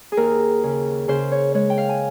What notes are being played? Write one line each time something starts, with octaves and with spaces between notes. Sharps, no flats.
G#4
D#2 A#4
C#3
C#3 C5
C#5
G#3 C#5
G5
F5
G#5